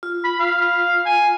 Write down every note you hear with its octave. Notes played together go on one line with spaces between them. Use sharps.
F4
B5
F5
G#5